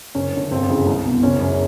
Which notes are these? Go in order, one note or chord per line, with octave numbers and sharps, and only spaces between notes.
F#1 C#4
F#2 D3
G1 C4
F#2 C#3 E3
C2
B2
F#1 C#4
F#2 C#3